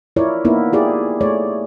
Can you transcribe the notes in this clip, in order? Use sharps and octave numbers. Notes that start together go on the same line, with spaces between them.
E4 F4 A#4 C#5 D5
A#3 B3 D#4 E4 A#4
E4 F4 G4 G#4 D5
A3 G#4 C#5 D5